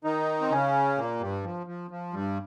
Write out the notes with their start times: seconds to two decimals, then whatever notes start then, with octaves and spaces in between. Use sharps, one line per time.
0.04 D#3 D#4
0.41 C4
0.50 C#3 C#4
0.98 A#2 A#3
1.20 G2 G3
1.44 F3
1.67 F3
1.91 F3
2.13 G2 G3